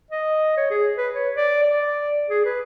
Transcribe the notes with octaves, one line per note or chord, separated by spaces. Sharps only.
D#5
C#5
G#4
B4
C#5
D5
D5
G#4
B4